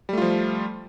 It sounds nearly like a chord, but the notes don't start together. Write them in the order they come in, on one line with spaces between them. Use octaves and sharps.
G3 A3 F4 F3